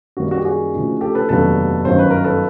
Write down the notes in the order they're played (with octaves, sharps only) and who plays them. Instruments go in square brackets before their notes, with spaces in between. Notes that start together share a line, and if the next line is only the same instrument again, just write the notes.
[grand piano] F#2 D#3 G3 A#3 F#4
F#4
G4
F#4 G#4
D2 C#3 F3 A#3 D#4
G4 A4
A4 B4
F1 D#2 D3 F#3 B3 A4 B4
G1 F#2 D#3 F#3 C5
B4
A#4
A4 B4